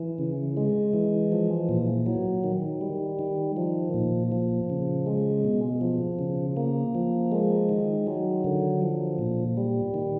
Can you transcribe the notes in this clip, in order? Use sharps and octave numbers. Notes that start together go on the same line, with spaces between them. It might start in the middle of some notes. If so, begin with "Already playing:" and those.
Already playing: E3
C#3
G#3
E3
F3
A#2
F#3
D#3
G3
D#3
F3
A#2
F3
C#3
G#3
B2
F3
C#3
A#3
F3
G#3
D#3
F#3
D3
F3
A#2
G3
D#3